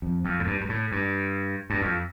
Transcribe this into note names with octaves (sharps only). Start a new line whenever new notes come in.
F2
F2
A2
G2
G2
A2
G2
G2
F2